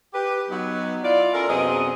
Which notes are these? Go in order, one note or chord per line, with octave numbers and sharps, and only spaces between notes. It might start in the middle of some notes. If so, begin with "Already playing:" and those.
G4 B4
F#3 B3 D#4
E4 F4 D5
C#4 F4 A4 A#4
F#2 C3 B3 C4 G#4 D#5